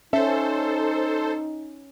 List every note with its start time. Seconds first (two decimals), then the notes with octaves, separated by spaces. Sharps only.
0.13 C#4 D#4 A4 C5 E5